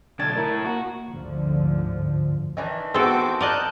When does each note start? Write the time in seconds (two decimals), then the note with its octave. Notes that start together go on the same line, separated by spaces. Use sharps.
0.19 B1 D3 D4 A5 G#6
0.36 A2 E4 A#4 A#5
0.65 A#3 F#4 A#5
1.10 G1 D2 G#2 D3 F3
2.57 D#3 E3 D4
2.94 B3 C4 F#4 G#4 A4 G5 D6 E6
3.41 A#4 D5 D#5 A5 F#6 G6